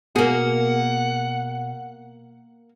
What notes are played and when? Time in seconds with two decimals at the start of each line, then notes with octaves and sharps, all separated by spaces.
0.16 B2 A#3 G#4 F#5